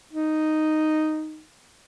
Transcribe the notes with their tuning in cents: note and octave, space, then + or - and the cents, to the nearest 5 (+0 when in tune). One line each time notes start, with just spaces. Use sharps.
D#4 -5